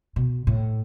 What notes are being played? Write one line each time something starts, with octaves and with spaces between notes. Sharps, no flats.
B2
A2